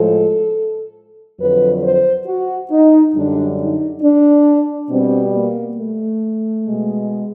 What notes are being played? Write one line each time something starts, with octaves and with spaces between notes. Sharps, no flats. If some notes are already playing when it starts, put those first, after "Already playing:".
Already playing: A2 F3 G#3 A4
F2 D3 F#3 B4
C5
F#4
D#4
F#2 D3 G3 D4
D#4
D4
B2 G3 C4
A#3
A3
B2 G#3